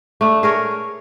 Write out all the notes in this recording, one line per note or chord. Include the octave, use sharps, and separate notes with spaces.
A3 D4
G#4 A#4 C#5